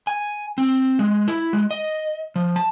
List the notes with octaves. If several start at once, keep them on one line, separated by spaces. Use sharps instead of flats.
G#5
C4
G#3
E4
G#3
D#5
F3
A5